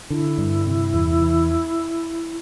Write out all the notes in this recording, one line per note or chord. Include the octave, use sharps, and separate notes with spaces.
D3 E4
G2
C3
E2
E3